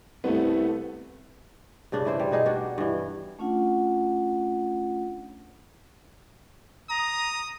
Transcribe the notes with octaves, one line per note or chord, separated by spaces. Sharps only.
C2 A3 B3
G2 C#3 D4
E3 E4 C5
G3
B2 D4 D#4 G#4
G3 D4 F#4
G2 E3
A3 C#4 D4 F4 F#5
A#5 D#6